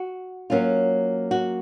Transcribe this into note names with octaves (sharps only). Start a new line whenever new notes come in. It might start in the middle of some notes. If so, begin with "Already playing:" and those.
Already playing: F#4
F#3 A#3 C#4 F4
F#4